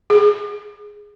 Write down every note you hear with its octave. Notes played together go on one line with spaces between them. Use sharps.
G#4